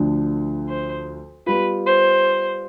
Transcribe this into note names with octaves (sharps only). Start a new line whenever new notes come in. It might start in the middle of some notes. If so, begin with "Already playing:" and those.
Already playing: D2 D3 F3
C5
G3 B3 F4 B4
C5